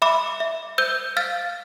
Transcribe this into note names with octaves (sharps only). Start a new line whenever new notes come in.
E5 B5 D6
E5
C5 E6 G6
F5 F6 A6